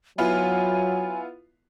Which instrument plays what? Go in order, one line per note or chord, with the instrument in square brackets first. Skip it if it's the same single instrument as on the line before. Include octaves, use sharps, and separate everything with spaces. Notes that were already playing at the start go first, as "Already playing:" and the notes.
[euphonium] F#3 [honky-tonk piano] B3 E4 F4 [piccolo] G#5